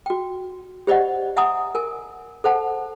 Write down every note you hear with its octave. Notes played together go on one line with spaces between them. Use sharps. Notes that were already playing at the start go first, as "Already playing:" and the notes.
F#4 G5
G4 C5 D5 D#5 F#5
E5 F#5 G#5 A#5 D#6
A#4 G#5
A4 C5 F#5 A5